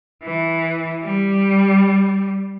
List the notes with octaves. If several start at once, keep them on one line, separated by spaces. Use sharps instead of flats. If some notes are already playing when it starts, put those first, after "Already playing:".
E3
G3